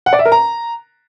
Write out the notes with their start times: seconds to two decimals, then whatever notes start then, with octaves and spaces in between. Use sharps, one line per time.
0.06 F#5
0.13 D5
0.19 E5
0.25 A#4
0.32 A#5